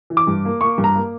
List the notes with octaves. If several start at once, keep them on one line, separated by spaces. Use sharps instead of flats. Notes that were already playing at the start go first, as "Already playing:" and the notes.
E3
D6
G2
A#3
A#3 C#6
G2
A#5
A#3